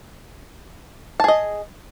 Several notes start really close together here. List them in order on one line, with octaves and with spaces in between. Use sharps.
A5 G#4 D#5